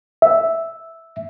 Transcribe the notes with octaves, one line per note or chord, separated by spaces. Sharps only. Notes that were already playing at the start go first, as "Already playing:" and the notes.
E5